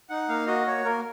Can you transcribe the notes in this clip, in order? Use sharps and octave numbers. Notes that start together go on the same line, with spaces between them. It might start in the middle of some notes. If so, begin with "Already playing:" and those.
D#4 F#5
A#3 F5
F#4 D#5
A#3 C#5
A#3 A#4